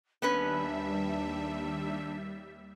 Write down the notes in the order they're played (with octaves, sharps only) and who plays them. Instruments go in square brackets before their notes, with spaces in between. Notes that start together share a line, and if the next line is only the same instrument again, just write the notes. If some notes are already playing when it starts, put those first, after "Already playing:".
[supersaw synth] D#2 G3 E5 [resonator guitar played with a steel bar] B3 C#4 B4 [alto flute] D4